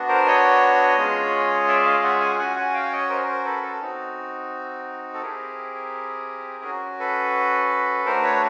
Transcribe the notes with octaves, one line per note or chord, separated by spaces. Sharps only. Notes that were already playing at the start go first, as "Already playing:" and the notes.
Already playing: B3 D4 F#4
A#4 C5
C#5 D#5
G#3 C#4 F4 G#4
D5 E5
D#5 F5
E5 F#5
F#5 G#5
C#4 F#4 F#5 G#5
F#5 G#5
F5 G5
C#5 D#5
A#4 C5
A#4 C5
A4 B4
A4
C4 D#4 F#4
A4
C4 E4 G4 G#4 A#4
C#4 F#4
A4 B4
A3 D4 F#4 A#4 C5
B4 C#5